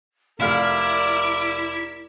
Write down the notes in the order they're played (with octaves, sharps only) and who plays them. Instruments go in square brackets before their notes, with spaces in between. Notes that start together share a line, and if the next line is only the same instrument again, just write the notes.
[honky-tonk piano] F1 F5 F6 [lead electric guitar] E4 [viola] A#4 D5 [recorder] B6